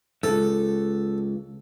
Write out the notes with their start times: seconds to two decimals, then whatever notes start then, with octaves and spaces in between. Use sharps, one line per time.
0.23 C#2 G#2 A4